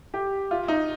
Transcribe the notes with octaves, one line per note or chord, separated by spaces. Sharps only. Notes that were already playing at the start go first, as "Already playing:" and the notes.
G4
F4
D#4